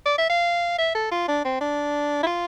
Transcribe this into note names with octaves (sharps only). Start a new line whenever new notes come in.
D5
E5
F5
E5
A4
F4
D4
C4
D4
E4
F4